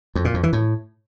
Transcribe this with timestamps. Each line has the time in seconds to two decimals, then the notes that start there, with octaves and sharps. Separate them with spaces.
0.15 F2
0.25 A#2
0.34 F2
0.43 E3
0.53 A2